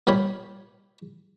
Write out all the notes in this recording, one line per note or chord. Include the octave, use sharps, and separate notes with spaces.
A#2 G3 G4 C#5 B5